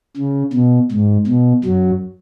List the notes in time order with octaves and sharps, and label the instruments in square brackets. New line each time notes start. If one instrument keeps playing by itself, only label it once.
[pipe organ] C#3
B2
G#2
B2
F#2 F#3